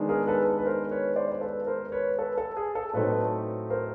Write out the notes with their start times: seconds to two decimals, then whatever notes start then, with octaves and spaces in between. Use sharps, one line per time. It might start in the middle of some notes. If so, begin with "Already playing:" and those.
Already playing: D#3 G#3 B3 D4
0.09 G#4 A#4
0.27 A4 B4
0.58 B4
0.66 A#4 C5
0.91 B4 C#5
1.16 C5 D5
1.32 C5
1.41 A4 B4
1.67 A#4 C5
1.92 B4 C#5
2.18 A4 B4
2.38 A4
2.57 G#4
2.75 A4
2.94 A2 F#3 A3 C4 D#4 A4 B4
3.70 A#4 C5